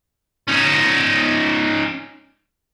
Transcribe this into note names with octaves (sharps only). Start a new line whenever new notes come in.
C#4 D#4